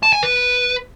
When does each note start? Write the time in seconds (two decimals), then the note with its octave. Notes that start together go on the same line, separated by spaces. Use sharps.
0.03 A5
0.13 G#5
0.23 B4